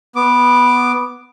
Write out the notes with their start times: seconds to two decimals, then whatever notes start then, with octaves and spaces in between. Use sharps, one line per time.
0.16 B3 D6